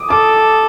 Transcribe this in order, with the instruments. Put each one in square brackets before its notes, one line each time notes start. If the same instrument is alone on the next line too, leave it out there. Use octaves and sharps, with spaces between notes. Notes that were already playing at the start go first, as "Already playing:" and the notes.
Already playing: [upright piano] D6 D#6
[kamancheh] A4 [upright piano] D6